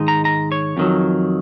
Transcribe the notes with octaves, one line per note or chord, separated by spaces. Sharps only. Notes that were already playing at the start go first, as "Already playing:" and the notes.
Already playing: G#2 D#3 G#3 D#4
A#5
A#5
C#5
F2 D#3 F#3